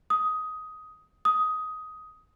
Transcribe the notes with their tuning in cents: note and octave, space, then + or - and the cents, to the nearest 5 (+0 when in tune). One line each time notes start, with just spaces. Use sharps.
D#6 +15
D#6 +15